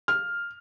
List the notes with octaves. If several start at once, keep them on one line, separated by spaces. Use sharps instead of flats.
F6